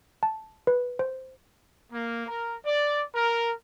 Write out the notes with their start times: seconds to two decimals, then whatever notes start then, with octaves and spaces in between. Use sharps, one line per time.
0.23 A5
0.67 B4
0.99 C5
1.93 A#3
2.27 A#4
2.65 D5
3.15 A#4